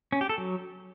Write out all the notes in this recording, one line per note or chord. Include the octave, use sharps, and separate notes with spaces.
C#4
G4
A4
F#3